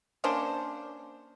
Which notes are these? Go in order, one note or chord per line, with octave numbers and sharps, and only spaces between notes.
A#3 C#4 D4 C5